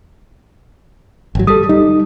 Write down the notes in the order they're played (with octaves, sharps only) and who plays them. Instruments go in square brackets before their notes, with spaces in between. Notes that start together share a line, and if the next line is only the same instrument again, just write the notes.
[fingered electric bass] G#1 F#3
[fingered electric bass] G3 [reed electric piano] A4 D#6
[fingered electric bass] G3 [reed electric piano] D#4